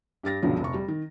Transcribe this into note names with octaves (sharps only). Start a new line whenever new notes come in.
G2 G4 A6 A#6
C#2 G2 B2 D3 F3 F#3
F1 C#6
G3
D#3